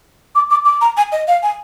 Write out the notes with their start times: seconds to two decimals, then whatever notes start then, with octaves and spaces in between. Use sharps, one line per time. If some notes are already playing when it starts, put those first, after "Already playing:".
0.35 D6
0.50 D6
0.65 D6
0.81 A#5
0.97 G#5
1.12 D#5
1.27 F5
1.43 G#5